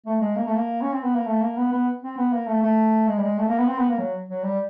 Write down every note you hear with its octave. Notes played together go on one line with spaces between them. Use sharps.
A3
G#3
A#3
A3
A#3
C#4
C4
B3
A#3
A3
A#3
B3
B3
C4
B3
A#3
A3
A3
G#3
G3
G#3
A3
A#3
B3
C4
B3
A#3
F#3
F#3
G3